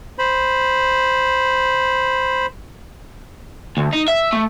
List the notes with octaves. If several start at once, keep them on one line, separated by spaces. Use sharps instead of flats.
C5 B5
D2
D#4
E5
A3